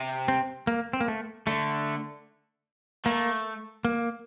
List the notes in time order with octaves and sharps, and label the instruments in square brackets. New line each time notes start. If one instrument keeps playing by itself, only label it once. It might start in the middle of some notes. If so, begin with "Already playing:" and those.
Already playing: [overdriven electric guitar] C3
[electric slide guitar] C4
A#3
C4
A#3
A3
[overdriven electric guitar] D3 [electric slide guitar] A3
[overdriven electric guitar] A3 [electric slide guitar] A#3
[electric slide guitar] A#3